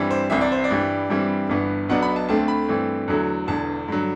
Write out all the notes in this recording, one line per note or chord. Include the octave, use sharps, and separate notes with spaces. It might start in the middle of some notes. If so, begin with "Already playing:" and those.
Already playing: G2 E3 G3 C4
C5
C2 C3 E3 E5
D5
C5
D5
G2 E3 G3
G2 E3 G3 C4
G1 G2 E3 B3
B1 B2 F#3 B3 D4 F#5
B5
A5
D2 D3 A3 C4 A5
B5
G2 E3 A3 C4
E2 D3 F#3 A3
E1 E2 D3 A5
G2 D3 F#3